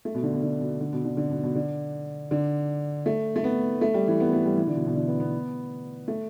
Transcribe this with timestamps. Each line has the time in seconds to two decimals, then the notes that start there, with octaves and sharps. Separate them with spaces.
0.05 A3
0.15 B2
0.23 D3
0.33 B2
0.43 D3
0.61 B2
0.80 D3
0.93 B2
1.05 D3
1.17 D3
1.31 B2
1.43 B2
1.55 D3
2.31 D3
3.06 A3
3.36 A3
3.44 B3
3.81 A3
3.94 G3
4.08 E3
4.20 B3
4.33 A3
4.45 G3
4.57 E3
4.67 D3
4.76 B2
4.86 B2
4.95 D3
5.08 B3
5.20 B3
6.08 A3